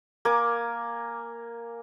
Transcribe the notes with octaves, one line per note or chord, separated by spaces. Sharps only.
A#3 A#4 G#5 D6